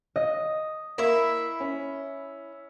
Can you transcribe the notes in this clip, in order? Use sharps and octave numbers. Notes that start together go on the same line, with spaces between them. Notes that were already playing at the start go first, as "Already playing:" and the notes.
D#5
A#3 E4 E5
C#4